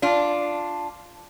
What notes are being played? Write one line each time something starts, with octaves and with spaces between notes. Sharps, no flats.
D4 F4